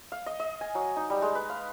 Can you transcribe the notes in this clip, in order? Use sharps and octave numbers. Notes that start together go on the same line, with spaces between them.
F5
D#5
D#5
G#5
F#3
D#4
G3
G#3
B4
F5